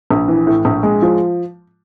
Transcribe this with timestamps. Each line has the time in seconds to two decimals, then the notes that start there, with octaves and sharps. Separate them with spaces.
0.10 A#1
0.28 E3
0.47 A2
0.65 A#1
0.83 G#3
1.02 F3